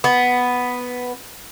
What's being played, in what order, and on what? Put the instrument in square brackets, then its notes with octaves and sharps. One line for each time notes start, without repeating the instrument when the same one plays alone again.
[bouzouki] B3